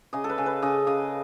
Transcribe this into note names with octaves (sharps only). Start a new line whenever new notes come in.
C#3 D#5
A4
B4
C#3
B4
C#3 D#5
C#3 D#5